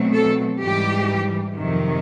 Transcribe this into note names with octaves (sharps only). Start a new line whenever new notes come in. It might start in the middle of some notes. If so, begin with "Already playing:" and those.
Already playing: B2 F#3 A3 C4
A4
G#2 E3 G3 G4
F2 C3 D#3 F#3